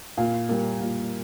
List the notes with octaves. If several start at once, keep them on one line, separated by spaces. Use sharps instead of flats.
A#2 F5
G3 A#3
A#2